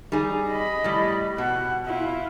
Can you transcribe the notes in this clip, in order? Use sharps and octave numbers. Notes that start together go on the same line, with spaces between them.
G3 D#4 G#4
D#5 B5
A2 G3
B2 F#5
E4 F4